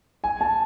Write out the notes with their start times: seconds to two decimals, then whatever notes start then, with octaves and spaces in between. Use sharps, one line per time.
0.24 G#5
0.41 A5